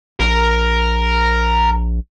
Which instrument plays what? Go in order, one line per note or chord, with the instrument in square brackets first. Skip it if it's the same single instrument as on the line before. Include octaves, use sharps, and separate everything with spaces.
[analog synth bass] A#1 [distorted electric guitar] A#4